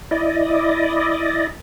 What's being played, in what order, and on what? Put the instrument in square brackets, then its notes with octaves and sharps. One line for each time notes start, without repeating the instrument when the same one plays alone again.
[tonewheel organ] E4 D5 D#5